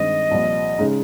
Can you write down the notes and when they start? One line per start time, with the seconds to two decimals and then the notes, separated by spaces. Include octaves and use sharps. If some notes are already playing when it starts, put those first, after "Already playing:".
Already playing: G2 D#3 G#3 C4 D#5
0.31 C2 A#2 F3
0.79 C#3 G#3 D#4